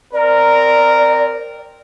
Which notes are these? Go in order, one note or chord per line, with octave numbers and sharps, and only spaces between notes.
C4 A#4 D5